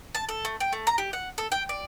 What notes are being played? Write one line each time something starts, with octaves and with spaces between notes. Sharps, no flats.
A5
A4
A3
G5
A3
A#5
G4
F#5
A4
G5
D5